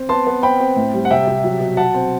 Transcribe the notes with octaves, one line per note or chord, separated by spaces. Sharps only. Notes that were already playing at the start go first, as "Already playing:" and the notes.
Already playing: C4
B3 A5 C6
B3
C4 G5 B5
C4
A2
G3
F#5
C3 E5 G5
C3
F#3
B2
B2 F#5 A5
C4